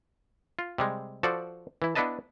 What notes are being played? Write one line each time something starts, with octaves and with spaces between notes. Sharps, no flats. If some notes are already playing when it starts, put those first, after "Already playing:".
F4
C3 G3 G#3
F3 F#4 A4 C5 D5
E3 E4
B3 D4 E4 B4 D#5 A5